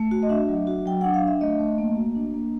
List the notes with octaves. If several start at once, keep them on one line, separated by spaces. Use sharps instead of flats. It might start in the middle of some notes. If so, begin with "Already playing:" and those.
Already playing: A3
F#4
D#5
D4 E5
F#3
F#4
F#3 G5
D4 F#5
F5
D4
E5
A3 D#5
A3
A#3
F#4
D4
A#3